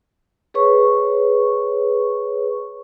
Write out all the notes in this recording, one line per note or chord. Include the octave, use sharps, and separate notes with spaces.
G#4 B4 C#5 C#6